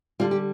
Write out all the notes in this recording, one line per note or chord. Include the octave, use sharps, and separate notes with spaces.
D3 G3 F4
G4